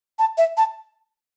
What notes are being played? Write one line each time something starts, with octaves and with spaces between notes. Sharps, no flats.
A5
E5
A5